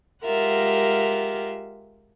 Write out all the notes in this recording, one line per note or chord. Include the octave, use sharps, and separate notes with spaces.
G#3 F4 G4 A#4 E5 F#5